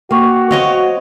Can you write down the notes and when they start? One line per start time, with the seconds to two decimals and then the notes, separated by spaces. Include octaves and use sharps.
0.11 A#3 F#4 G5 C#6
0.51 F#3 C4 C#5 D#5 F5